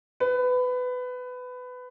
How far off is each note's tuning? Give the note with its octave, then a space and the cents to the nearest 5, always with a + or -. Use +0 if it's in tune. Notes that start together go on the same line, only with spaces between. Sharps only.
B4 +20